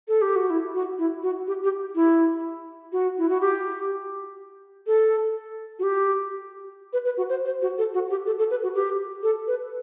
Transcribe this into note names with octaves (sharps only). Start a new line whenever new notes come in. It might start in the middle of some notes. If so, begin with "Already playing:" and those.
A4
G4
F#4
E4
F#4
E4
F#4
G4
G4
E4
F#4
E4
F#4
G4
A4
F#4
G4
B4
B4
F#4
C5
C5
F#4
A4
F#4
G4
A4
A4
B4
F#4
G4
A4
B4